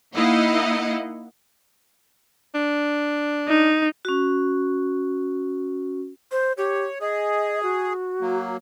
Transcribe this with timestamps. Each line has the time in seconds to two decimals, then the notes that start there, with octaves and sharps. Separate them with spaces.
0.15 A#3 D#4 E4 D#5 F5 F#5
2.55 D4
3.47 D#4
4.05 C#4 F#4
6.32 C5
6.58 G4 C#5
7.01 G#4 D#5
7.63 F#4
8.21 F#3 A#3